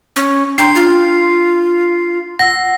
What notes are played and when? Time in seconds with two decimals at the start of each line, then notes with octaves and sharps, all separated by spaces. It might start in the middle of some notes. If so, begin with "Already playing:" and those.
0.16 C#4
0.58 D4 G5 A#5 C6 C7
0.75 F4
2.39 F#5 E6 A#6